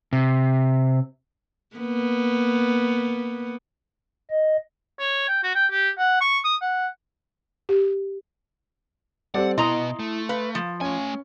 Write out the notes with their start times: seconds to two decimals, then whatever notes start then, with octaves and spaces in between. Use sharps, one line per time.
0.13 C3
1.76 A#3 B3
4.30 D#5
5.00 C#5
5.28 G5
5.43 F#4
5.55 G5
5.72 G4
5.98 F#5
6.21 C#6
6.44 D#6
6.62 F#5
7.69 G4
9.35 G3 C4 G4 A4 D5 F#5
9.58 B2 B3 E4 D#5 A#5 C6 D#6
9.99 A3
10.29 B4 F5
10.55 F3
10.81 A3 C#4 G#5